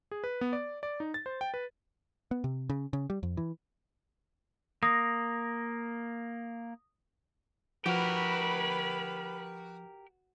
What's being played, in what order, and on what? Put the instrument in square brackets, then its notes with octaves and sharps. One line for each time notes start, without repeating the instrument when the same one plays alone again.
[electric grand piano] G#4
B4
B3
D5
D5
D#4
A6
C5
G5
B4
[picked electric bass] B3
C3
C#3
C#3
G3
F2
E3
[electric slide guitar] A#3 [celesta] D#6 A#6
[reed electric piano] F3 [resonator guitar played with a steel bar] F#4 [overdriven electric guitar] G4 A#4 [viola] B4 B5